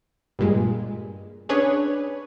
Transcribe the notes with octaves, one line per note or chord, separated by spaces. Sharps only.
G2 A#2 G#3
C#4 D4 G#4 B4 C#5